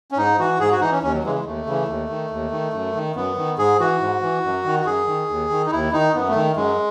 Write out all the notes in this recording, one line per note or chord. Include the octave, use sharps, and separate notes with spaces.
C#4
G#2 D#4
E3 F#4
G#2 G#4
F#4
E3 D#4
C#4
D#2 C#4
F#3
C#3 E3 G#3
G#3
D#2 A3
C#3 E3
D#2
D#3
D#2
D#3
F#2
D#3
F#2 B3
D#3
G#2 G#4
E3 F#4
G#2
E3
F#2
D#3
F#4
F#2 G#4
D#3
D#2
D#3
D#4
D#2 E4
D#3 D#4
F#2 B3
A3
D#3
F#2 G#3